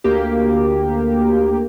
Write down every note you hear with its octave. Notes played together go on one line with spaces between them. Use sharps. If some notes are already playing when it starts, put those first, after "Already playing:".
D2 A#3 G4